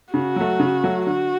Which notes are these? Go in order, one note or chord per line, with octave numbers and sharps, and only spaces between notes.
C#3 F#4
F#3 A3
C#3
F#3 A3
D3 F#4